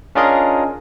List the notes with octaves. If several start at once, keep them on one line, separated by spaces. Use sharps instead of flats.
C#4 D4 F4 G#4 A#4 D#5